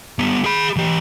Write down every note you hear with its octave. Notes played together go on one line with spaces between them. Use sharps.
G3 B3
G#4 B5
E3 G4